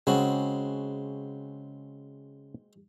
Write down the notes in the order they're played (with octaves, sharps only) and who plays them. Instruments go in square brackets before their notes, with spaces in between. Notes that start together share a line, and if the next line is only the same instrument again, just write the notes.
[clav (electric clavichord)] C#3 [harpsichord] G#3 C4 F#4